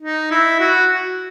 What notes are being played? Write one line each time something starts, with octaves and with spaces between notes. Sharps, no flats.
D#4
E4
F#4